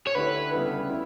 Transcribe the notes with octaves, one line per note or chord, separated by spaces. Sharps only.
C#5
D3 A3 E4 G4 B4
C#3 G3 B3 E4 A4
E4